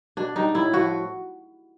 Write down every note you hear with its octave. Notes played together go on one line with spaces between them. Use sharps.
B2 D4
G3 D#4
A2 E4
F3 F#4